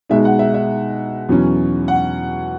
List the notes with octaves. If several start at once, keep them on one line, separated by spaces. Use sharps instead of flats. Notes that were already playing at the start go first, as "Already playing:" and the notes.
B2 G#3 D#4 E5
F#5
E5
E5
E2 B2 F#3 C#4
F#5